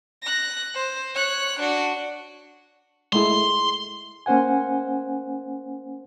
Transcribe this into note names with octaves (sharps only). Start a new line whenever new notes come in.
F#6 A#6
C5
C#5 F#6
D4 F#4
G#3 A3 E4 C6
A#3 C#4 C5 F#5 G#5